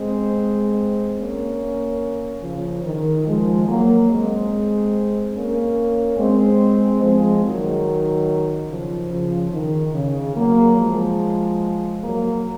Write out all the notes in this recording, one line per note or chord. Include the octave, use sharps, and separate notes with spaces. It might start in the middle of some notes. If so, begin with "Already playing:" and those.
Already playing: G#3 C4
A#3 C#4
C#3 F3
D#3
F3 G#3
F#3 A#3
G#3 C4
A#3 C#4
G#3 C4
F3 G#3
D#3 F#3
C#3 F3
C#3 F3
D#3
C#3
F#3 A#3
F3 G#3
F#3 A#3